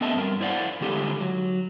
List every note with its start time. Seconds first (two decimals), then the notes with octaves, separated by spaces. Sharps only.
0.01 B3 C4 A4 D#5 E5 A5
0.16 G2 A#4
0.41 E4 C5 D5 F5 F#5
0.81 D3 G#3 D#4 F4 G4 A4
1.20 F#3